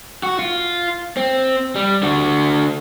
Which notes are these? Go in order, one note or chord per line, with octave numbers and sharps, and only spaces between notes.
F#4
F4
C4
G3
D3 F#4